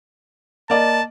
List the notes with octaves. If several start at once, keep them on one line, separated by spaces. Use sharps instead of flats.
A#3 D5 D#5 A5